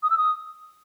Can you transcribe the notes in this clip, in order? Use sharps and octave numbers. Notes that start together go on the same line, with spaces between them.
D#6
E6
D#6